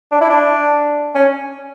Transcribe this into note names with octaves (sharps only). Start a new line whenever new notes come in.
D4
E4
D4
C#4